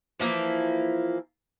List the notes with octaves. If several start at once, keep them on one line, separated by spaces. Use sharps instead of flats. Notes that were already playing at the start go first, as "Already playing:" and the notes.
E3 F3 A#3 E4